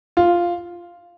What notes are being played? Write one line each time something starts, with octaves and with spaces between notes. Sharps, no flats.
F4